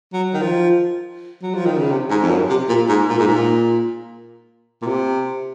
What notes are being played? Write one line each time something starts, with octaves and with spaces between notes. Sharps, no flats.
F#3
D#3
F3
F#3
F3
D#3
C#3
C3
G#2
F2
F#2
C3
A#2
G#2
A#2
G#2
A#2
A#2
C3